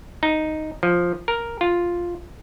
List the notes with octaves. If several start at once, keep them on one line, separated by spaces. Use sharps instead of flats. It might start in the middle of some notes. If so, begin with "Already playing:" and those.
D#4
F3
A#4
F4